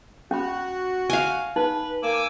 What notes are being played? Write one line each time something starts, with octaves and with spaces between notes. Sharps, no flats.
C#4 F#4 B5
F5 G#5
D#4 B4
A#3 G#5 D6 E6